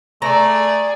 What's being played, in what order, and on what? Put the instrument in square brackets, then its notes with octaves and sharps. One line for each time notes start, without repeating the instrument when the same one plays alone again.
[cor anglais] A3 [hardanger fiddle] G#4 D5 [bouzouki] A#5